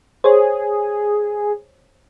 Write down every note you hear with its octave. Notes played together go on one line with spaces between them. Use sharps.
G#4 C5 C#5